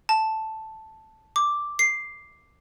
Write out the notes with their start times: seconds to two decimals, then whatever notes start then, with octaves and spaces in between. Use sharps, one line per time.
0.09 A5
1.36 D6
1.79 C7